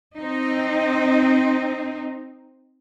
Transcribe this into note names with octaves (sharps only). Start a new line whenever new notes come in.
C4 D#4